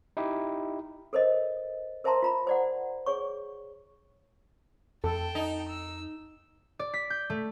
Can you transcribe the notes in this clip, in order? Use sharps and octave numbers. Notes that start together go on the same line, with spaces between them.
D#4 E4 G4
A4 A#4 C5 C#5 D#5
A#4 C5 E5 A5 A#5 C6
F4 A#5 B5
C5 D5 F#5
G#4 C#5 C#6
F2 A4 G5 A5
D#4
E6
D5
B6
G6
A3